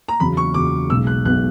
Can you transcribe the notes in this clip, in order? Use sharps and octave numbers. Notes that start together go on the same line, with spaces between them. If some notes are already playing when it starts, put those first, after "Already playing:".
A#5
E2 C#3 F#3 B5
C#6
E2 C#3 F#3 D6
B1 B2 G#3 B3 E6
F#6
B1 B2 G#3 B3 F#6